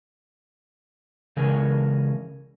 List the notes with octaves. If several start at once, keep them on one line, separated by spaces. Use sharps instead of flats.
C#3 E3 G#3 C#4 A#4